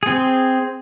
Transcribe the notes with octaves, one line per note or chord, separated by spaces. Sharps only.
C4 G#4